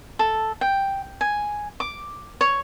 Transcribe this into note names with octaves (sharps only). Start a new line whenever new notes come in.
A4
G5
G#5
D6
C#5